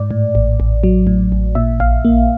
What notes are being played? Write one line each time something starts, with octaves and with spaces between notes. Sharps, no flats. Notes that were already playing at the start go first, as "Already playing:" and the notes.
Already playing: G#2 D5
A2
A1
A1
F#3
A2
A1
A#2 E5
A#1 F5
A#3